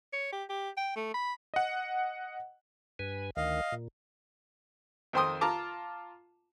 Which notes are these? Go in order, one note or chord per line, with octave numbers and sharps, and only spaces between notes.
C#5
G4
G4
G5
A3
B5
D#5 F#5
G2 B4 G#5
D2 D#3 D#5 F5
A#2
F2 D#3 C5 G5 C6 D#6
F4 A5 A#5 D6